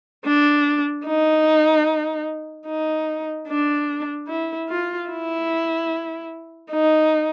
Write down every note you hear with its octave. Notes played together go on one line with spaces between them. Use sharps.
D4
D#4
D#4
D4
E4
F4
E4
D#4